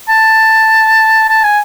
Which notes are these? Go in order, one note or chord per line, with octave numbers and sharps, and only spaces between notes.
A5
A5
G#5